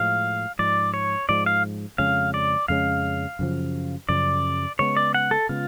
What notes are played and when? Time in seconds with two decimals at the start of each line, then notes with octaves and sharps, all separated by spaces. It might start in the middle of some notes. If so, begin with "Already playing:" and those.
Already playing: A2 F3 G#3 F5
0.59 G#2 F3 G#3 D5
0.94 C#5
1.29 G#2 F3 G#3 D5
1.46 F5
1.98 F2 C#3 G#3 C#4 F5
2.34 D5
2.68 F2 C#3 G#3 C#4 F5
3.39 F#2 C#3 F3
4.09 F#2 C#3 F3 D5
4.79 C#3 G#3 B3 C#5
4.96 D5
5.14 F#5
5.31 A4
5.49 C#3 G#3 B3 F4